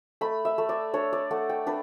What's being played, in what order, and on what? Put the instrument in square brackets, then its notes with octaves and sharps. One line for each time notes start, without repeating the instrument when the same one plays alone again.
[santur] A3 B5
E5
A3
D5
D4 C#5
D5
A3 F#5
G5
D4 B4